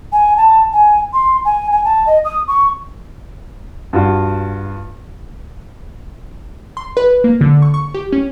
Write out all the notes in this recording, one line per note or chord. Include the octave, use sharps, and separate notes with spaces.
G#5
A5
G#5
C6
G#5
G#5
A5
D#5
D#6
C#6
G2 F4 F#4
C6
B4
A#3
D3
C#6
C#6
G4
C#4